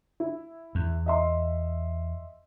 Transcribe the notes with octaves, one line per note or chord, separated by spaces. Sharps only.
E4
E2
D#5 E5 C6